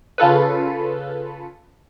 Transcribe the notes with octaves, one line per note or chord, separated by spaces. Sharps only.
C#3 F4 A4 B4